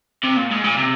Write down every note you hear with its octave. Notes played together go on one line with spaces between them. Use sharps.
C3
A#2
G#2
A#2
C3